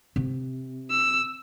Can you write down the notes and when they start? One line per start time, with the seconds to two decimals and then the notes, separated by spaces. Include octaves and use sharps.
0.16 C3
0.91 E6